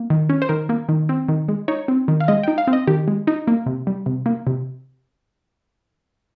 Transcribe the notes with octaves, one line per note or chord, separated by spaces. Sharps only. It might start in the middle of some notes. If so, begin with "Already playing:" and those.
Already playing: A#3
D#3
C#4
C5
D#3 A#4
A#3
D#3
C4
D#3
G#3
D#4 C#5
C4
D#3
F5
G#3 D#5
D#4 G5
F5
C4
D#5
D#3 G4
G#3
D#4
A#3
C3
G3
C3
A#3
C3